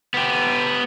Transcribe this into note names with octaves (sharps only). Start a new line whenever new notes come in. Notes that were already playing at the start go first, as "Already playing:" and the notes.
B3 G4